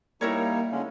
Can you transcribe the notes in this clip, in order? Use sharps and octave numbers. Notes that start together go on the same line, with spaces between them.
G3 A#3 D#4 E4 A#4 C#5
D3 G#3 C#4